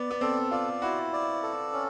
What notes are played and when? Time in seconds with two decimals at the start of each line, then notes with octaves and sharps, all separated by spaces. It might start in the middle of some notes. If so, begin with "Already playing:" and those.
Already playing: B3 D5
0.10 B3
0.21 C4 A4
0.51 F4 D5
0.82 E4 F#4
1.13 D5
1.43 A4
1.73 C#4